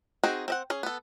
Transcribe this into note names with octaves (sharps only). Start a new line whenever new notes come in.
C4 D#4 F#4 G#4
C4 D#5 F#5
C#4 G#4
B3 A4